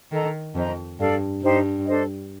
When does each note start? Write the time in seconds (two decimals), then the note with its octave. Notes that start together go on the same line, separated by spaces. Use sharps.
0.12 D#3 A4 D#5 A#5
0.55 F2 C5 D#5 A#5
0.99 G2 A4 D5 F5
1.42 G2 D#4 G4 C5
1.86 D4 A4 C5 D#5